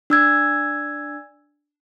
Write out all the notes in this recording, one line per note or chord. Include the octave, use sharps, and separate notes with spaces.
D4 E6 G#6